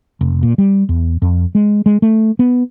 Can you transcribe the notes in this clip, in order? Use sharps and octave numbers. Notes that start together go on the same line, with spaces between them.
F1
A#2
G3
E2
F2
G#3
G#3
A3
B3